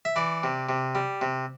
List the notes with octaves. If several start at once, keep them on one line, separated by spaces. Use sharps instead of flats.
E5
E3 D5
C3
C3
G3
C3